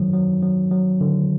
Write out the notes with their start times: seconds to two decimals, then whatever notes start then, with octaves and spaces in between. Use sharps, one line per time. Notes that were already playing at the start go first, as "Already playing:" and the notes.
Already playing: D#3 F#3
0.13 F#3
0.42 F#3
0.71 F#3
1.01 D3